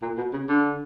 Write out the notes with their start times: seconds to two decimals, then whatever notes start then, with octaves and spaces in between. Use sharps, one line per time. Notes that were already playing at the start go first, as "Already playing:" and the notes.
0.02 A#2
0.18 B2
0.33 C#3
0.49 D3